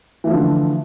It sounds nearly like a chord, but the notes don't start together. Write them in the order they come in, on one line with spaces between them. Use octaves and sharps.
E3 A3 F3 D3